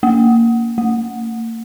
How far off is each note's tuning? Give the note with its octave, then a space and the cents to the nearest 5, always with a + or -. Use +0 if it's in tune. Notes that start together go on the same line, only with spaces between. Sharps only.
A#3 -15
A#3 -40